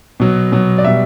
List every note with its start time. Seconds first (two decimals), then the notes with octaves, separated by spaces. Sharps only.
0.20 B2 F#3
0.52 B2 F#3
0.78 D5
0.84 B2 G3 E5